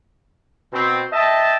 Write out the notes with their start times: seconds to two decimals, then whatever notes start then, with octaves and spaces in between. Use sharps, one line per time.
0.73 B2 C4
1.13 D#5 E5 G5 A5